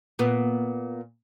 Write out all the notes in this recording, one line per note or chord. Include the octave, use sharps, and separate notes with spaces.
A#2 B3